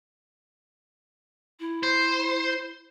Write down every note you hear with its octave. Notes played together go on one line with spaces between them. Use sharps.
E4
C5